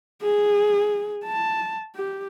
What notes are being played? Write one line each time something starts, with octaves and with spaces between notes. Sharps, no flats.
G#4
A5
G4